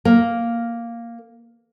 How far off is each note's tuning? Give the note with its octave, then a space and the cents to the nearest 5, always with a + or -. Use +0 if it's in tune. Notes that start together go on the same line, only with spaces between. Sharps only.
A#3 +0